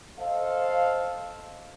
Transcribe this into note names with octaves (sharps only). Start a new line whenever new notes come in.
A4 C5 D#5 F5